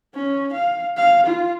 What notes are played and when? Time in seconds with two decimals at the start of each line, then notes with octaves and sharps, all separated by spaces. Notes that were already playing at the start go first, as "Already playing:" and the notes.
0.15 C#4
0.53 F5
0.97 F5
1.27 F4